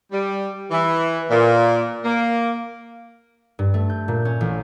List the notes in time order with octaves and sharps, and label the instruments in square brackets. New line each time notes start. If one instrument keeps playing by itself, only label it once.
[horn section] G3
E3
A#2
A#3
[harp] G2
A3
G6
A#2
C#4
A1